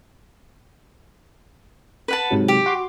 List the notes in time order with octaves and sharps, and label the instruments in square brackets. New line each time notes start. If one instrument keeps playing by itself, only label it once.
[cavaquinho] B4 F#5 A5
[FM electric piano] G#2 C3 F#3
[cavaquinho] G4
[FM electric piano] F#4 C6 D6